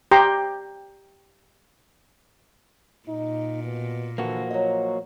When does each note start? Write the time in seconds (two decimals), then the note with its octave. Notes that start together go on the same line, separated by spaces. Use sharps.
0.11 G4 G5 A#5 C6
3.08 A#2 D#4
3.64 B2
4.18 D3 E3 F3 A#3 F#4
4.51 F#3 D#5